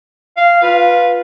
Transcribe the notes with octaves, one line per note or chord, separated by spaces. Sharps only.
F5
F4 B4